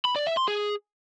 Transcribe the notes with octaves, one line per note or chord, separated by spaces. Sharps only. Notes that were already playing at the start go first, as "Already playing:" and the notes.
B5
D5
E5
C6
G#4